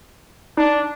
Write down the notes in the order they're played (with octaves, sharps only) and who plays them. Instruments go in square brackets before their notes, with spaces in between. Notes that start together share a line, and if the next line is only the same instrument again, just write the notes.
[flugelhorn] D4 [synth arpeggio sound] D#4